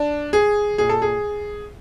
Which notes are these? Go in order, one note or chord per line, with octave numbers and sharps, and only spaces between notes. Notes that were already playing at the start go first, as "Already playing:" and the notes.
Already playing: D4
G#4
A#2 G#4
A4
G#4